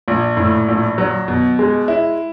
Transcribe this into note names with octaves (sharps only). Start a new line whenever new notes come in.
A#1
A2
A#1
F#3
B2
G#3
E4